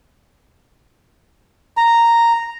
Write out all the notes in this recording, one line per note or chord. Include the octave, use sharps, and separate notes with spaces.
A#5